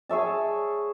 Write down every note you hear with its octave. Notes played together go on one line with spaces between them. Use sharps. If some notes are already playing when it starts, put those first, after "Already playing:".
G#4 C#5 E5 A5